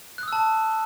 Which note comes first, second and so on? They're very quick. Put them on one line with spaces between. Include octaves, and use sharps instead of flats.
F#6 D#6 E6 A5